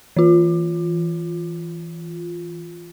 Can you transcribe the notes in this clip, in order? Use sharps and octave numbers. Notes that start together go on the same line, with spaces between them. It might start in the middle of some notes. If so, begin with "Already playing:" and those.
E3 F4